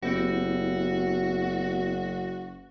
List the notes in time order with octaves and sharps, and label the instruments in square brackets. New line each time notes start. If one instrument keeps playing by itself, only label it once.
[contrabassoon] F#1 [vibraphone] B3 E4 G4 [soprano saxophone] F#4